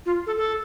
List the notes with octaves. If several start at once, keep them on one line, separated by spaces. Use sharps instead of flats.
F4
A4
A4